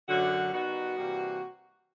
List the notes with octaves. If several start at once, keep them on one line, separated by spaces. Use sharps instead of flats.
F#2 D3 F#3 F#4
D#3 G3 B3 D#4 F#4
C3 E3 G3 A#3